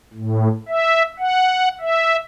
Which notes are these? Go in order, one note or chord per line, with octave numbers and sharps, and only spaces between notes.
A2
E5
F#5
E5